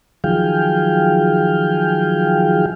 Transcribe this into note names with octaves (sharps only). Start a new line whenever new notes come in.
D#3 F3 F#3 G#4 F5 G5